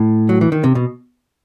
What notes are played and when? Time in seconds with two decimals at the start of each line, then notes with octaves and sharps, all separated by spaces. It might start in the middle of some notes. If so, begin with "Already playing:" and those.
Already playing: A2
0.29 F#3
0.41 E3
0.52 D#3
0.64 C3
0.75 B2